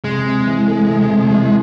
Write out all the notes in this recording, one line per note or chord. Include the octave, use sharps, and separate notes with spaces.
C3 G#3
C4
E3
A3
C3
C3
E3